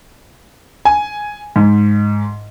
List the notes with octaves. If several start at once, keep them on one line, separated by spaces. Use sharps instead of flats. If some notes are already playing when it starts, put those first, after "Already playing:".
G#5
G#2